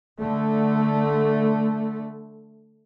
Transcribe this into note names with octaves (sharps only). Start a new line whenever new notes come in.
D3 A3